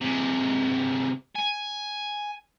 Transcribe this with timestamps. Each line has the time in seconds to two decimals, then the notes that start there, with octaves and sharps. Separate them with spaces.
0.01 C3 G#3
1.36 G#5